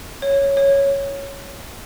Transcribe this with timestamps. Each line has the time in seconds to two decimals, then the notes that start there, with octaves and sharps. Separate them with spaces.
0.22 C#5
0.57 C#5